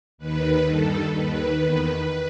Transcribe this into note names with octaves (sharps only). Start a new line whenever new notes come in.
D#2 D#3 B4
G2 D#3 A4
D#2 D#3 B4
E2 D#3